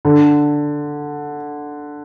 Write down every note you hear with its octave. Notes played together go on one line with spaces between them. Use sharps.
D3